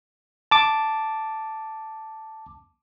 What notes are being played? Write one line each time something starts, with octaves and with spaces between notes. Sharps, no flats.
A5 D6